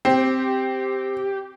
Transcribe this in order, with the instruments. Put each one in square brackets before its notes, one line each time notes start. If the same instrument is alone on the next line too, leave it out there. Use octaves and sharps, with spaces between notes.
[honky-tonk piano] C4 [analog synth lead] G4